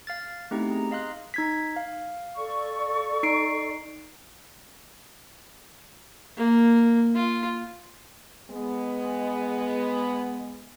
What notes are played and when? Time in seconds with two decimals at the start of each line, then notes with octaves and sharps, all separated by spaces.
0.07 F5 F6 A6
0.51 A3 B3 C4 D#4 E4 G4
0.70 G#4 A#5
0.91 D#5 F5 C6 F#6
1.34 D#4 G#6 B6
1.76 F5
2.37 A4 D5 C#6
3.23 D#4 C7 D7
6.36 A#3
7.15 F4
8.51 G#3 B3